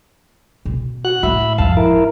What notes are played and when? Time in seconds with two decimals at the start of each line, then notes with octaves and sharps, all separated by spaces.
0.65 B2
1.05 F#4 F#6
1.23 A2 E5 B5
1.58 G#1 F2 F5 A5
1.77 E4 A#4